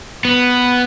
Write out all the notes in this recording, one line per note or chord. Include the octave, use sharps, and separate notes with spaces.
B3